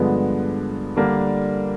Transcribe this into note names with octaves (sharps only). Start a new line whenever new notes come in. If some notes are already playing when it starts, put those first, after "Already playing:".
Already playing: G2 D3 F3 G#3 B3
D3 G3 A#3 D4